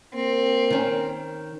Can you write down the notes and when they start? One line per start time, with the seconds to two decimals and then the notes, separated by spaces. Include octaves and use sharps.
0.14 A#3 C4
0.70 D#3 C#4